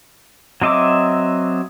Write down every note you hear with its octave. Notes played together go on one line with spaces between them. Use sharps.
F#3 C4 D#5 E5 D6